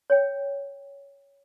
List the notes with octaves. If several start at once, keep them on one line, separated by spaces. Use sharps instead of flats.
C#5 G5